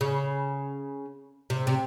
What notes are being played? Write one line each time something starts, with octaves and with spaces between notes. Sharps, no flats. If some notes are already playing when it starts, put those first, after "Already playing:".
C#3
C3
C3